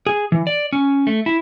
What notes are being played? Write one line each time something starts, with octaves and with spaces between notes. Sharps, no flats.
G#4
E3
D5
C#4
A3
E4